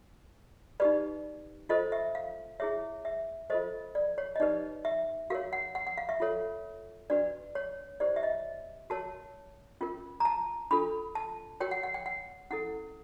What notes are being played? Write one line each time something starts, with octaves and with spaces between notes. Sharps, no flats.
D#4 G4 B4 D5
F4 A4 C5 D#5
E5
F5
E4 G#4 C#5 E5
E5
F4 A4 C5 D#5
D5
C#5
D#5
D#4 G4 B4 D5
E5
F#4 A#4 C#5 F5
F#5
F#5
F#5
F5
E5
F4 A4 C#5
D4 F#4 B4 D5
C#5
E4 G4 C5 D5
E5
D#5
F#4 A#4 C#5 A5
C#4 F4 A#4
A#5
A5
D4 F4 A4 B5
A5
F#4 A#4 C#5 G5
F#5
F#5
G5
F#5
C#4 E4 A4 F#5